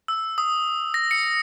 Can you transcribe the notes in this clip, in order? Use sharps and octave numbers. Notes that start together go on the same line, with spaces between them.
E6
D#6
A#6
C#7